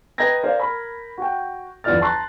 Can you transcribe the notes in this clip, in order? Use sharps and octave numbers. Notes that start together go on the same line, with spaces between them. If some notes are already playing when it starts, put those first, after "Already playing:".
B4 D#5 G5 A#5 G#6 A#6
A#4 C5 D5 F5
A#4 B5
F#4 G5
G1 E2 F3 D5 F6 A6
A5 A#5 C6 F#6 A6